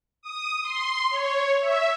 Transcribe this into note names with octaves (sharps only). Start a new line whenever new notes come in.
D#6
C6
C#5
E5